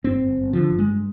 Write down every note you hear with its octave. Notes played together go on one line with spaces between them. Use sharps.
G1 C4
G1
G1
D3 F3
G1
G#3
G2